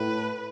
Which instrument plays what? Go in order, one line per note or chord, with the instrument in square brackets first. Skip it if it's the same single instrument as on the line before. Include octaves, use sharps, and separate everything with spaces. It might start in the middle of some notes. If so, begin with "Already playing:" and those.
Already playing: [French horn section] A2 [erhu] B4